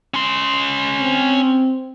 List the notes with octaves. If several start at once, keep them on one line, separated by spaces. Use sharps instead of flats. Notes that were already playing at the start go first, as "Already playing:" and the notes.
C#4 C6
C4